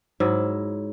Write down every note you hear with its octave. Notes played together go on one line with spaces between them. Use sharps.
G#2 F#3 E4